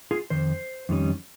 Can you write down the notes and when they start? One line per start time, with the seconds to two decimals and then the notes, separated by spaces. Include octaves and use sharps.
0.11 F4 G#4
0.30 F2 D#3 C5
0.89 F2 D#3 G3 C#4